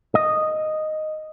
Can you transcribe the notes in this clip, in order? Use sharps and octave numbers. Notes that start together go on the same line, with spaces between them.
D#5